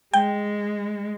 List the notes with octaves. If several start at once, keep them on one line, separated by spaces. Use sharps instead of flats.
G#3 G5